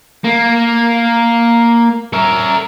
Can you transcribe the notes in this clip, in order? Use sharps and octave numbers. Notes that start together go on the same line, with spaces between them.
A#3
A#4 E5